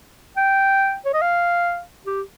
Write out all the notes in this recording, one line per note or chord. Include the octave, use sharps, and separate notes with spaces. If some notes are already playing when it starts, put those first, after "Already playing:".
G5
C#5
D#5
F5
G4